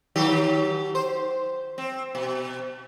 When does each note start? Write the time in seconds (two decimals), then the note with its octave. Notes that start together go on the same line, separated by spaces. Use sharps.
0.16 D#3 F#3 G4
0.95 C5
1.78 C4
2.15 B2